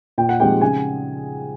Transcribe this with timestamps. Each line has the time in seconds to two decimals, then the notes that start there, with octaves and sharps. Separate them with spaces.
0.18 A#2 G5
0.29 F#5
0.40 F3 G#3 C4 D#4 G4 G5
0.61 C#3 G#4 G#5